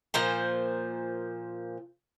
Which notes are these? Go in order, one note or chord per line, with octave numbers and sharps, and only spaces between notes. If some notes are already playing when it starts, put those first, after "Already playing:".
A#2 F3 C5 A#5